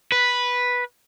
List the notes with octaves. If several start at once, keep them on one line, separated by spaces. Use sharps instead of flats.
B4